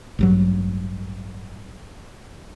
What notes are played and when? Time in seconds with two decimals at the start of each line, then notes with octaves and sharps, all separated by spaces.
0.19 A1 G2 F#3